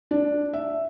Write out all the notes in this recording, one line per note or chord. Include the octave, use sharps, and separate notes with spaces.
D4
E5